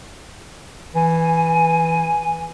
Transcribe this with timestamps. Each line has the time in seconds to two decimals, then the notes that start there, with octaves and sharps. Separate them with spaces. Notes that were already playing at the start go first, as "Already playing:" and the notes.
0.95 E3 G#5